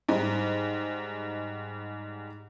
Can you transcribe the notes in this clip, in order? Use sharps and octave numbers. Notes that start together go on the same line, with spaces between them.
G#2 G3 D#4